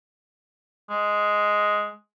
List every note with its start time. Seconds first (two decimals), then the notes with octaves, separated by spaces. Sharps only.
0.90 G#3